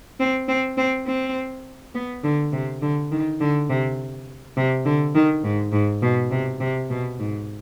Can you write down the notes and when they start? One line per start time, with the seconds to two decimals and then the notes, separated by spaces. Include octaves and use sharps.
0.20 C4
0.48 C4
0.77 C4
1.07 C4
1.95 B3
2.23 D3
2.52 C3
2.82 D3
3.12 D#3
3.41 D3
3.70 C3
4.57 C3
4.85 D3
5.15 D#3
5.44 G#2
5.73 G#2
6.02 B2
6.31 C3
6.60 C3
6.90 B2
7.19 G#2